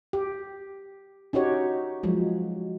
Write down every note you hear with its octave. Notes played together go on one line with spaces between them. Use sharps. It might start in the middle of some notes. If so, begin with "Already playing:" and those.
G4
C#4 D#4 F#4 G4 C#5
F3 F#3 G#3